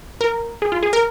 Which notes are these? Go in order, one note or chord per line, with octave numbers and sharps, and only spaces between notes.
A#4
G#4
F4
G#4
A#4